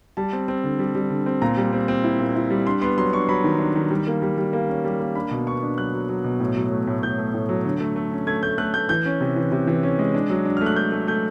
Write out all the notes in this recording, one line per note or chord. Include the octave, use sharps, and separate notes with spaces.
G3 A5
C4
C4
D3
G3
G3
D3
C4
A#2 A#5
G3
C4
C4
E4
A#2
E4
G3
D4 C6
B3 C6
F#3 C6
D4 C#6
F#3 B5
D#3
D4
D#3
G3
A#3
G3
G3
A#3
C#4
G3
A#3
D4 B5
B2
B3 C#6
D4
F#3 F#6
F#3
F#3
B2
A2
F#3
A3
A2
A2 G6
A3
A2
F#3
D3
A3
A3
C#4
A3 G#6
A3 G6
A3 F#6
A3 G6
E3 G6
C#4
C3
E3
C3
E3
C#4
G#3
D4
F#3
D4
A3 F6
F#6
A3 G6
A3
A3 G6